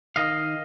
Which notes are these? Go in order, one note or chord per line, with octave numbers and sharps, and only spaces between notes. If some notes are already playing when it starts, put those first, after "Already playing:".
D#3 D#5 F5